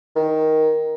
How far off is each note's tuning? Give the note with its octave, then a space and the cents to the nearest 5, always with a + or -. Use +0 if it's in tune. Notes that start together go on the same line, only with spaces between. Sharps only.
D#3 +10